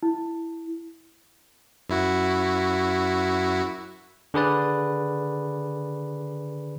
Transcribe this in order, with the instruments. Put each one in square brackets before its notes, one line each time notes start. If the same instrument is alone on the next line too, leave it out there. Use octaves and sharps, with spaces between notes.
[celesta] E4
[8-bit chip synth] F#2 E4 F#4
[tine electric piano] D3 G#4 B4 D5